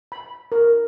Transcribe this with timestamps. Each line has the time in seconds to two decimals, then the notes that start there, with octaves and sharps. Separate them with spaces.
0.12 B5
0.52 A#4